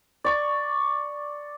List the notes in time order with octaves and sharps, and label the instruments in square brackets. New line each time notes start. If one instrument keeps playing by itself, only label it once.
[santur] D5 C#6